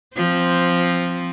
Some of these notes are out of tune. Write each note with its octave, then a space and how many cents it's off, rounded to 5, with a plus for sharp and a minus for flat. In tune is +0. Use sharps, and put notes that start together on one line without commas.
F3 +0 C4 +0